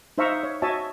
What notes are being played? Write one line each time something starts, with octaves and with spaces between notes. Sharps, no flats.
D#4 C5 E5 F5 A#5 C#6
C#5
F#4 C#5 D#5 E5 G#5 A5